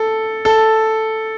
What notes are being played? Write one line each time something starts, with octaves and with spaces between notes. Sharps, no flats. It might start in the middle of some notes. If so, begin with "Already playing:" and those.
Already playing: A4
A4